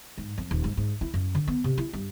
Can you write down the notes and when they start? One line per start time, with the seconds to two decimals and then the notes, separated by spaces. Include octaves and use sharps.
0.18 G#2
0.38 F2
0.51 D#1
0.64 G#2
0.77 G#2
1.01 E4
1.14 F#2
1.35 D3
1.47 B3
1.64 C3
1.78 E4
1.93 G2